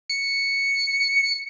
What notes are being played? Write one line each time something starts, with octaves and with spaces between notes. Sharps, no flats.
C#7